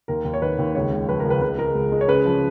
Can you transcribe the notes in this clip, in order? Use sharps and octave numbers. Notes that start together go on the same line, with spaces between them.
D#2 A#4
D#2
C#5
D#3 B4
D#2
C#2 C#5
C#2
F3 B4
A#4
C#2
B4
C#2 B4
G#3 A#4
C#2
G#3
C#5
C#3 B4
F3